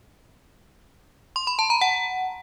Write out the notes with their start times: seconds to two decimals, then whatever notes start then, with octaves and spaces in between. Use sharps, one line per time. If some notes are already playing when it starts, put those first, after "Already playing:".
1.36 C6
1.47 B5
1.59 A5
1.70 A#5
1.81 F#5